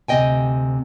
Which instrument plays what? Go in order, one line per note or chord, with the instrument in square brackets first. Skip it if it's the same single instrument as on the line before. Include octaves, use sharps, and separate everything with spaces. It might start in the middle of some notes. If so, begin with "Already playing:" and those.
[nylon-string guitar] D2 C3 A3 D#5 G5 G#5